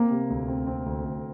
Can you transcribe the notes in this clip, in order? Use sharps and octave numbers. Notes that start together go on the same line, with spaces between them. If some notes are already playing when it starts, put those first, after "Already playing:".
Already playing: A#3 C4
C3
D2
C4
C4
D2
D2